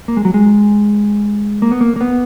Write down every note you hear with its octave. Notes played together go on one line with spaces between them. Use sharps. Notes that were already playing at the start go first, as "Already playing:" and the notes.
A#3
G#3
F#3
G#3
A#3
B3
A#3
A#3
B3